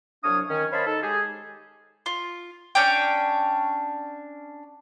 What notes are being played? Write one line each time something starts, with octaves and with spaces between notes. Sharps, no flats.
C2 F#3 D4 C#5 F5 D#6
D#3 C#4
C5 C#5 D#5 F5 A5 B5
D#4 A4
G#3 G4 G#4
F4
C#4 D4 C#5 G5